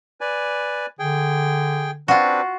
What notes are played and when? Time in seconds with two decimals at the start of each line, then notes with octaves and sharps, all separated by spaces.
0.21 B4 D5 G#5
0.99 D3 G#4 G5
2.08 C4 D4 F4 F#4 B4